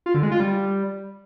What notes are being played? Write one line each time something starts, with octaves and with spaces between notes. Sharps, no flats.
F4
D3
G#3
F4
G3